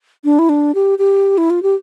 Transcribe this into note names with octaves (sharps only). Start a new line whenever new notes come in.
D4
E4
D4
G4
G4
E4
F4
G4